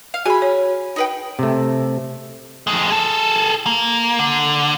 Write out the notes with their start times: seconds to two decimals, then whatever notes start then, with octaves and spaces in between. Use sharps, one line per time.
0.14 F5
0.26 F#4 G#4 G#5 B5
0.42 C#5
0.96 D#4 B4 G5
1.39 C3 A3
2.67 F2 G#3
2.90 G#4 A4
3.66 A#3
4.19 D3